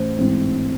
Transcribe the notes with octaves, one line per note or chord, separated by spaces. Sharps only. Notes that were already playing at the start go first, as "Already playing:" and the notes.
Already playing: A1 C5
G#2 E3 G#3 C4